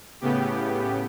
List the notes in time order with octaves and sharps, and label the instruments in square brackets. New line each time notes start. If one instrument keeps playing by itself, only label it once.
[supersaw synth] A2 C#3 B3 G4